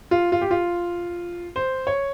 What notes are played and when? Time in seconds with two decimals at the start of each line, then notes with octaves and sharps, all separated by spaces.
0.11 F4
0.32 F4
0.41 G4
0.51 F4
1.56 C5
1.87 C#5